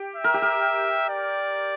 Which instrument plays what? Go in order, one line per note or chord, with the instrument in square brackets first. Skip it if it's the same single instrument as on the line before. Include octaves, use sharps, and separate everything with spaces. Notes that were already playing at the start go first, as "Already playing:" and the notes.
Already playing: [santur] G4
[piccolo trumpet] E5
[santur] A#4
G4
A#4
[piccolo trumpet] D5